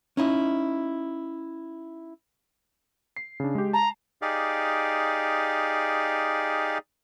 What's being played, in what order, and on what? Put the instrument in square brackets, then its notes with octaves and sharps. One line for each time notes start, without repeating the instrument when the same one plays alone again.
[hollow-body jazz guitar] C#4 D#4 E4
[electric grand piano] C7
C#3 D4
G#3 G4
[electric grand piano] A5 [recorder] A#5
[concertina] D#4 G4 G#4 D5 F5